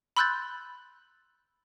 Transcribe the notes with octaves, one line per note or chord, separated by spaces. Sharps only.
B5 C6 E6 F#6 G6 A6